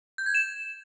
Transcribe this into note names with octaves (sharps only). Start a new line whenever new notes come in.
G6
G#6
E7